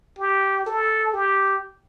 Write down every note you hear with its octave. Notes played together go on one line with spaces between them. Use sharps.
G4
A4
G4